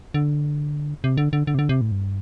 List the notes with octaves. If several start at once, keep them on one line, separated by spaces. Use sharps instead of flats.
D3
C3
D3
D3
D3
C3
D3
C3
A2
G2